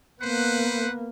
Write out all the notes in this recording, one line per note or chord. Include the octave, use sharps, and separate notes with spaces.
A#3 B3 B4 C5 F#5